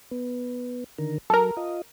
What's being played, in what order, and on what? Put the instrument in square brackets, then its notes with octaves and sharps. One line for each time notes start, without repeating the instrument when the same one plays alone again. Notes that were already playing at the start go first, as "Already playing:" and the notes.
[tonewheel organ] B3
D3 D#3 A#4
[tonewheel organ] F#3 [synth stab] A4 A#4
[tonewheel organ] F4 D#5